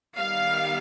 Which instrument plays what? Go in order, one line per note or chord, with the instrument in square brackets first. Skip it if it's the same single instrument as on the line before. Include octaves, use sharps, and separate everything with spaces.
[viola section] D#3 G3 B3 F5